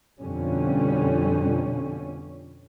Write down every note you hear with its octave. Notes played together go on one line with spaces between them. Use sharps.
F2 B2 D3 G3 C#4